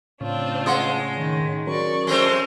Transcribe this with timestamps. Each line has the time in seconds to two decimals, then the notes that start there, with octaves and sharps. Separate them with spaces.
0.21 A2 C#3 C4 D4 F4 C#5
0.66 G#3 F#5 C6 D#6
1.16 D#3
1.67 F#3 C#4 A#4 D5 C#6
2.07 G#3 A3 C4 C6 F6